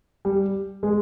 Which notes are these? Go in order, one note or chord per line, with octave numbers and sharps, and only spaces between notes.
G3
G#3